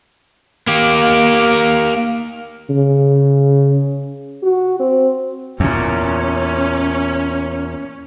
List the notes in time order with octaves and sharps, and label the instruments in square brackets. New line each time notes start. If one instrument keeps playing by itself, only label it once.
[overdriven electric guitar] A#3 G4
[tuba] C#3
[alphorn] F#4
C4
[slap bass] E2 A#2 [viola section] C#4